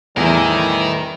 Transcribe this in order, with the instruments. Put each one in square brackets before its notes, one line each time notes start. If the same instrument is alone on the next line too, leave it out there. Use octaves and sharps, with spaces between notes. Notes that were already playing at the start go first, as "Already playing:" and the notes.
[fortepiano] E2 [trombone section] A2 E3 G3 [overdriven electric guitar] D#4 A#4 [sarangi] E4